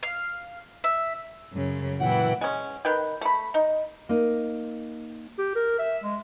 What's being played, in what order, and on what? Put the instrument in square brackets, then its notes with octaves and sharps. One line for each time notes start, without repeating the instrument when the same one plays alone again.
[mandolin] F5
E5
[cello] F#2 C#3
[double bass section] A#2 E3 F#3 [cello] E4 G5 [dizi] F#5
[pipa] G#3 C#4
D#3 B4 G5
A3 B5
D#4
[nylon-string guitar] A#3 D#4
[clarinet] G4
A#4
E5
G#3